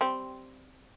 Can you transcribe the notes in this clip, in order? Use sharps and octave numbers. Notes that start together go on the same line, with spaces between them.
G3 C4